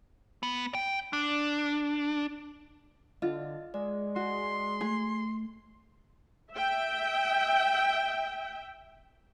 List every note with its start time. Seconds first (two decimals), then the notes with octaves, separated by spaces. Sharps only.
0.43 B3
0.75 G5
1.13 D4
3.22 D3 F4 D#5
3.74 G#3 D5
4.16 F#4 C6
4.81 A3 G#4
6.54 E5 G5